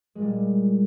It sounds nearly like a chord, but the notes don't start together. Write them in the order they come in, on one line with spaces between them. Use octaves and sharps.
G#3 A#2 G3